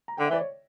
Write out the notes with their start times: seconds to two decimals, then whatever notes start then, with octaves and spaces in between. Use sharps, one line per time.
0.08 A#5
0.17 D3 G5
0.25 E5
0.30 E3
0.33 D5
0.41 C#5